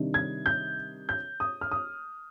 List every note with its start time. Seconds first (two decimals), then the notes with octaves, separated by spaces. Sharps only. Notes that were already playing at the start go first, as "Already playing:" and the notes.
Already playing: C3 D#3 G3 D4
0.14 G#6
0.46 G6
1.09 G6
1.40 D#6
1.61 F6
1.71 D#6